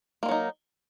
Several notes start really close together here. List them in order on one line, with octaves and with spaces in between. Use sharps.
A#3 G#3 F#3 D#4